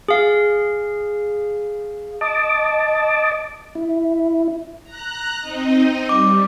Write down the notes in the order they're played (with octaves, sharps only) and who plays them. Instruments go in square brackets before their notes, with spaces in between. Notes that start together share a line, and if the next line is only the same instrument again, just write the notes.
[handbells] G#4 F5
[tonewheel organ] D#5 A5 D6
E4
[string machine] A#5 F#6
C4 D#4 D#5
[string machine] G3 [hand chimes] D6